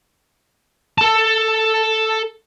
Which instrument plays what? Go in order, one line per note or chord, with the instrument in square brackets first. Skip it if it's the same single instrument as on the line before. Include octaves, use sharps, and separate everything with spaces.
[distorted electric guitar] A4 A5